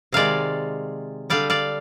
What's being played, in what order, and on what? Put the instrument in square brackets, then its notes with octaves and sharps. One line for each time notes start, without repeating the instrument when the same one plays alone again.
[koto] C3 D#3 G#3 D5 F5
D3 G3 D5 F5
D5 F5